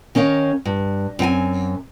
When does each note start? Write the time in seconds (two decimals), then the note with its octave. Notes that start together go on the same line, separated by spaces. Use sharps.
0.15 D#3 C#4 A#4 C#5 F5
0.65 G2
1.19 F#2 C4 G5 G#5